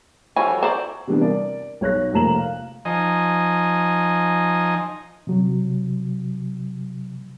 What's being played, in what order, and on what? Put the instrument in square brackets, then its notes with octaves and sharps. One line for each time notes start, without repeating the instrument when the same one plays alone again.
[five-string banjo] E3 F3 G3 [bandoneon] F#4 A4 C#5 [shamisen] G#5
[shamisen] C5 [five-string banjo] D5 A#5
[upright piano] C3 E3 G3 B3 D4
A#4 D5
B1 C#5 F#6 A#6
F1 F2 A#3 A#5 E7 F#7
F5
[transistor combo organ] F3 D#4 D#5 G#5
[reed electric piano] C3 F#3